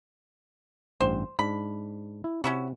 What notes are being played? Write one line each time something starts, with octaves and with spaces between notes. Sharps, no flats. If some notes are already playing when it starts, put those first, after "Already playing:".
A1 G2 C5 G5
G#2 D4 B5
E4
C3 C#4 E4 F#4